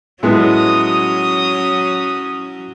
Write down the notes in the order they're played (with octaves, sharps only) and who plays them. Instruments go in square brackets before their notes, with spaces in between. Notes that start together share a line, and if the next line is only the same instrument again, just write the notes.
[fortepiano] A2 G#3 B3 [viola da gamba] F#3 C#4 [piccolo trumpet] D#6